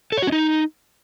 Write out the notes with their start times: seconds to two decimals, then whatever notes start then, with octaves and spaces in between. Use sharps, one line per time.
0.12 A4
0.17 C#5
0.22 F#4
0.27 C#4
0.32 D#4